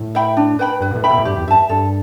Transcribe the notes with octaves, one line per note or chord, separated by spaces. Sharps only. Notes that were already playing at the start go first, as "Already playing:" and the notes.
Already playing: A2
E5 G5 B5
D4
B4 G5 B5
G2 B4
B2
A2
E5 G5 B5
B2
A2
G2 G4
E2
G2 E5 A5
G2 A4